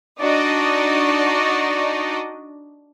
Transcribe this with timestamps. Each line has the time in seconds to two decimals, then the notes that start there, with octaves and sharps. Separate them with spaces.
0.20 D4 D#4 F#4 D5 D#5